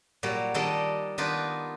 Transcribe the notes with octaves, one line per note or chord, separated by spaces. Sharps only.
A#2 F#3 G3
D#3 G3 D4 A4 D#5
D#3 B3 D4 D#4 F4 B4